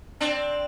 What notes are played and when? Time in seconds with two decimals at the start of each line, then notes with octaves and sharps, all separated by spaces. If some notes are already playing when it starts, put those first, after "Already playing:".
0.20 C4 D4